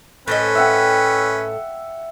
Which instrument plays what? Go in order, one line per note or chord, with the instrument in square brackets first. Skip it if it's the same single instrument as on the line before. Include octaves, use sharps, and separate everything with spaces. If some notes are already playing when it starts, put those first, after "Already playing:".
[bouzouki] A2 C5 D#5 [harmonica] C#4 B4
[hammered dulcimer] E5 F#5 G5